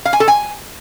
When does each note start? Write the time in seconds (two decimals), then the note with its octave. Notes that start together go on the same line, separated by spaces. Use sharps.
0.05 F5
0.13 G#5
0.20 A4
0.28 G#5